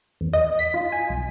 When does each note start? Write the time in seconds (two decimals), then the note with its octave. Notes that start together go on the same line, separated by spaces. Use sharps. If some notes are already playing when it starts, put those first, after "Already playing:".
0.21 E2
0.33 D#5
0.59 B6
0.74 F4
0.92 G#5
1.09 C2